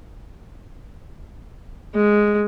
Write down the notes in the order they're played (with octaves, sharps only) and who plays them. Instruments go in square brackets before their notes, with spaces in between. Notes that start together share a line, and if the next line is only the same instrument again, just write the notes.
[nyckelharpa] G#3